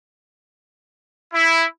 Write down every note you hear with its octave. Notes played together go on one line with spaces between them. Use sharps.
E4